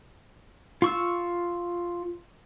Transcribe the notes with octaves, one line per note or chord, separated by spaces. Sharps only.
F4 C#6 E6